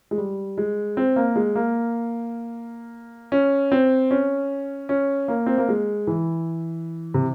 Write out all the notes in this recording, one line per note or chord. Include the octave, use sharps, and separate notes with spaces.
G#3
G3
G#3
C4
A#3
G#3
A#3
C#4
C4
C#4
C#4
A#3
C4
A#3
G#3
E3
C3